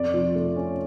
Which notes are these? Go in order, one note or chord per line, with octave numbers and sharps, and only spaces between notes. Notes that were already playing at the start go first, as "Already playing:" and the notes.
Already playing: F2 D5
F3
A3
C#4